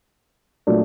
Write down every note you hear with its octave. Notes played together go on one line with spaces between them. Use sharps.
A#2 F#3 A3 D4